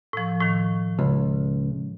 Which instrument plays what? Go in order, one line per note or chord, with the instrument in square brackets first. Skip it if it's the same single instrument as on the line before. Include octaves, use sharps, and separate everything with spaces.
[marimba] A2 F3
A2 D#3
[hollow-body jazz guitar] C#2